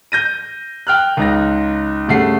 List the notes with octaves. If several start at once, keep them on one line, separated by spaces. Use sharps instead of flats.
G6 A#6 D#7
G5 F6 F#6
C#2 D#4 A#6
G2 C#3 A3 F#5 C7